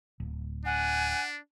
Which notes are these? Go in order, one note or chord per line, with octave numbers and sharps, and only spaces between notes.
D1
D4 F#5 G#5